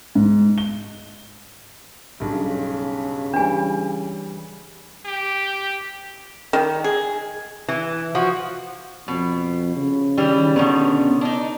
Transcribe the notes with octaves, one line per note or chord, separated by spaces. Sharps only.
G#2
G7
B1 G2 C#3
E3 G3 D4 G#5
G4
D#3
G#4
E3
F3 F#4
F2 B2
C#3
D#3 E3 G3 D#4
B2 D3 D#3 B3 C#4 D4
D4 D#4 D#5